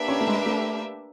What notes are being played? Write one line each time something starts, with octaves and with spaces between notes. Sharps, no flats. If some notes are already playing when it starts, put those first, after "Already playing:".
Already playing: A#3 D4 G4 B4 E5
C#4
A3
G#3
A3